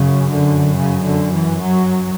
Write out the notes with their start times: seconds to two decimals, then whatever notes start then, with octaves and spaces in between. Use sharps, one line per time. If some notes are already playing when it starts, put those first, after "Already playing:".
Already playing: F#2 C#3
0.32 D3
0.76 C#3
1.05 D3
1.34 E3
1.63 F#3